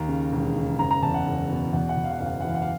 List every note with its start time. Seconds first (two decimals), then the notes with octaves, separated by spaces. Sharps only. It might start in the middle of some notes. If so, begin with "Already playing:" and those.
Already playing: D#2 A#5
0.08 C#3
0.32 E1
0.56 C#3
0.79 F#1 A#5
0.91 A#5
1.02 E2 A5
1.14 F#5
1.26 F#1
1.50 B2
1.73 E2 F#5
1.89 F#5
1.97 E2
2.04 F5
2.11 F#5
2.19 F#1 F5
2.26 F#5
2.33 F5
2.41 F#5
2.44 E3 F5
2.55 F#5
2.62 F5